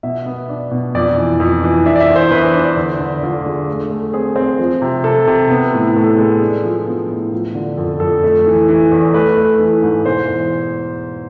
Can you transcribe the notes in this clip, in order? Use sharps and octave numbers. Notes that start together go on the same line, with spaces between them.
B2 E5
B3
D4
B2
F2 D5
E3
F2
E3
D4 E5
D5
E5
E2
C5
E2 B4
D4
D3
D3
D3 F4
G#3
A3
A3
C4 G#4
C4
F3
C3
C3 A4
C3
B3
A2
A2 A4
G#3
D4
F3
B3
A2
F3
D3
F2 A4
F2 A4
A3
E3
E3
E2
A3 B4
A3
E3
G#2
B2 C5
E2